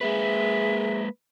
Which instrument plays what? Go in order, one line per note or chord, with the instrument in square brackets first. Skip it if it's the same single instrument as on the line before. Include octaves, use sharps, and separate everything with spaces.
[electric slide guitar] G#3 A#3 B4 [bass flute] G#4 [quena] E5